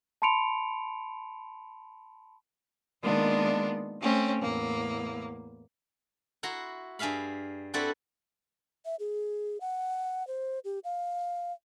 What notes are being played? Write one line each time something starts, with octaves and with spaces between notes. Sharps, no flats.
A5 B5 C6 C#7 D7 F7
D#3 G#3 A#3 B3 D4 F4
A3 C4 C#4
E2 A2 A#3
E4 F#4 A#5 C6
G2 G#4 E5 F5 B5
C4 D4 E4 F#4 A4 B4
E5
G#4
F#5
C5
G4
F5